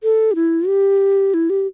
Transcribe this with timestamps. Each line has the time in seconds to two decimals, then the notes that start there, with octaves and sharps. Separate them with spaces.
0.03 A4
0.31 G4
0.35 E4
0.67 G4
1.34 E4
1.50 G4